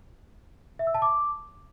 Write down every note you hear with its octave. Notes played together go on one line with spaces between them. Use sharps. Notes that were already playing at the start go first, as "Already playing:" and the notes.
E5
E6
A5
D6